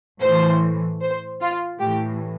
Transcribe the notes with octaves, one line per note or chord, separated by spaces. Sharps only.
A2 E3 C5
C5
F4
A2 E3 G4